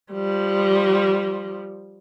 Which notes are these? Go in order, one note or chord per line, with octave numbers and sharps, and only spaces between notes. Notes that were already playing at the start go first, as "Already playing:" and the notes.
F3 G3